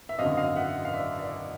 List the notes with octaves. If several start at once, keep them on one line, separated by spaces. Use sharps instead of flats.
E5
G#1 F#2 D3 D#5 F5
D#5 F5
E5 F#5
F5
D5 E5
D5 E5